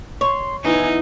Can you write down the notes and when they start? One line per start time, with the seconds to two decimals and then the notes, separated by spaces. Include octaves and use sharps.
0.21 C#5 C6
0.65 E3 B3 D#4 E4 G#5